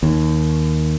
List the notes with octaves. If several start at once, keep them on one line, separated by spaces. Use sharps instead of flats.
D#2